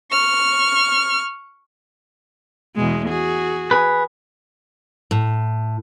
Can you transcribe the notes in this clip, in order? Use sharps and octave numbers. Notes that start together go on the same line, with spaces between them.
C#6 F6
E2 B2 G#3
F#4 G#4
G#4 B4
A2